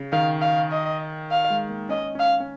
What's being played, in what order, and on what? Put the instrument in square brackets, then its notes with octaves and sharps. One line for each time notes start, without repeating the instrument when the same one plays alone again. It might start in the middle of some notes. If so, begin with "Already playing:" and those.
Already playing: [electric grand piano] C#3
[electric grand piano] D#3 [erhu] F5
[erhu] F5
D#5
F5
[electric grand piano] G#3
A#3
[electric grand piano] C#4 [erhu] D#5
[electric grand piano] C#4 [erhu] F5
[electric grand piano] C#4